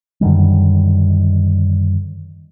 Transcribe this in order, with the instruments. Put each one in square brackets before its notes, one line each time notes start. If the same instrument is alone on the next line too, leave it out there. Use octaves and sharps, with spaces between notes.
[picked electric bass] F#2 D3 D#3 G3